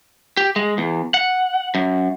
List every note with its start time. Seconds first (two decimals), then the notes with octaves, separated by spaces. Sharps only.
0.37 G4
0.56 G#3
0.78 E2
1.14 F#5
1.75 F#2